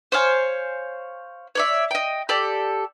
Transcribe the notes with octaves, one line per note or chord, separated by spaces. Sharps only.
C5 C#5 F5 G#5
C#5 D5 E5
D#5 G5
G4 A4 D5